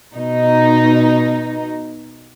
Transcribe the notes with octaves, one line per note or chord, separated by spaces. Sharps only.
B2 D#4